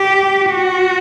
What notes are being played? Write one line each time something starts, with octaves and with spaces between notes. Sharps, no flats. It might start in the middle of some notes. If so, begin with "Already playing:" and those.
Already playing: G4
F#4